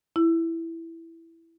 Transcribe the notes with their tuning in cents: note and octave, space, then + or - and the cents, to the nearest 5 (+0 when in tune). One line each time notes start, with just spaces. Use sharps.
E4 +5